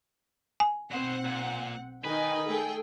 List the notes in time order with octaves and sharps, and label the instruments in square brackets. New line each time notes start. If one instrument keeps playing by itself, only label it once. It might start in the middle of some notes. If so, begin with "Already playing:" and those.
[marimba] G#5
[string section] B1 C4 F#5 [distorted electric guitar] B2 C5
[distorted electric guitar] A#2
[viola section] D#3 D#4 D#5 [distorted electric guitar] B4 [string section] G5 G#5
[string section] A3 G#4 G5 [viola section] A4